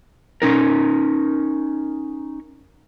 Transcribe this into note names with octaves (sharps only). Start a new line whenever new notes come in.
C#4 D#4 A#4